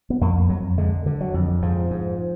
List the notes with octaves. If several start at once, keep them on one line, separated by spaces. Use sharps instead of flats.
B3
F2 A#3
F2 F#3
D3 G#3
D3
F#3
F2
G#2 F3
G#2